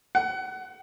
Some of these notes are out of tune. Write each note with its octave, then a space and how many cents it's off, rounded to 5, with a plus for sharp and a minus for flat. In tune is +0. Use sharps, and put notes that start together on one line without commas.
F#5 +25